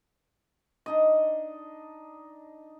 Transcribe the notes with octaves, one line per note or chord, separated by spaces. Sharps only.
D4 D#4 D#5